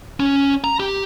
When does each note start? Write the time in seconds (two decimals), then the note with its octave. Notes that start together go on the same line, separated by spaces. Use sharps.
0.20 C#4
0.64 A#5
0.80 G4